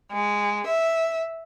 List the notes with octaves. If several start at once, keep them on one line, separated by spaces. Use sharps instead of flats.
G#3
E5